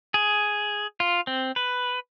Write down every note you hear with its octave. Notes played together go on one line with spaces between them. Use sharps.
G#4
F4
C4
B4